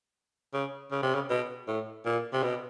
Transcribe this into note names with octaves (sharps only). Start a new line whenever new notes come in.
C#3
C#3
C3
C#3
B2
A2
A#2
C3
B2